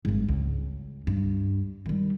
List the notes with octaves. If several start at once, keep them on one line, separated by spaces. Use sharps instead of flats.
G#1 G2
C#2
G2
D#3 G3